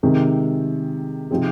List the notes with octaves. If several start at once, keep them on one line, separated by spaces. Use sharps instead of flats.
C3 D#3 G#3
C3 F3 C4 D#4 G#4